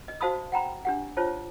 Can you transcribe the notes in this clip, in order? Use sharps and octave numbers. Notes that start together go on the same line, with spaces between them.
D#5
F#4 C5 F5 A5 B5 D#6
F#5 G5 A#5 B5
D4 G4 F#5
F4 C5 C#5 A5